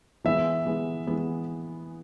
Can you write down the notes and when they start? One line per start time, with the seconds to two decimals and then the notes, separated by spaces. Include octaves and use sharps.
0.24 E3 G#3 B3 E5
0.66 E3 G#3 B3
1.07 E3 G#3 B3